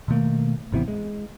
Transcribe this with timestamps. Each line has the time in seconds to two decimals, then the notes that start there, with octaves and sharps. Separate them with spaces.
0.08 B2 D#3 A3 A#3
0.72 G#1 C3 E3 B3
0.88 G#3